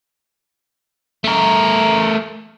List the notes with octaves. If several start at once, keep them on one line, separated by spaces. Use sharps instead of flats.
A3 A#4